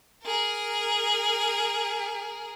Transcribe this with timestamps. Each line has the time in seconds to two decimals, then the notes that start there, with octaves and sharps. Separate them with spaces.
0.23 G#4 A#4